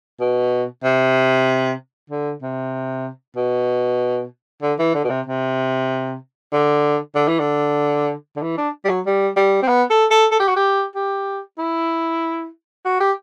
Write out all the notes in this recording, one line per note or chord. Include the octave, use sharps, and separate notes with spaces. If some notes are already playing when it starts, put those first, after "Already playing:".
B2
C3
D3
C3
B2
D3
E3
D3
B2
C3
C3
D3
D3
E3
D3
D3
E3
D4
G3
F#3
G3
G3
C4
B3
A4
A4
A4
G4
F#4
G4
G4
E4
F#4
G4